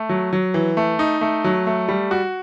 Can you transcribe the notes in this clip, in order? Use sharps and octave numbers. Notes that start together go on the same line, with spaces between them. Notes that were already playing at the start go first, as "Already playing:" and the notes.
Already playing: A3
F#3
F#3
E3
A3
D#4
A3
F#3
A3
G3
F#4